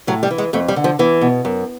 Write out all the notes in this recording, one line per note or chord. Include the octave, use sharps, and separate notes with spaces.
A2 F#3
G3
E3
G#3
F2 A3
G3
D3
F3
E2 E3
B2
F#2